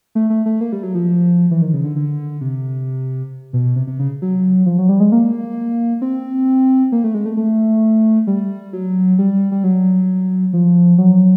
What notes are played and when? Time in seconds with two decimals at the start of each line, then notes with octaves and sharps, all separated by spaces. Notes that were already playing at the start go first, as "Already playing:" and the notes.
0.15 A3
0.30 A3
0.46 A3
0.61 A#3
0.72 G3
0.83 F#3
0.95 F3
1.51 E3
1.62 D#3
1.74 C#3
1.84 D3
1.96 D3
2.41 C3
3.53 B2
3.76 C3
3.87 C3
3.99 C#3
4.22 F#3
4.66 F3
4.79 F#3
4.89 G3
5.00 G#3
5.12 A#3
6.02 C4
6.92 A#3
7.04 A3
7.14 G#3
7.26 A3
7.37 A3
8.27 G3
8.73 F#3
9.19 G3
9.52 G3
9.64 F#3
10.53 F3
10.98 F#3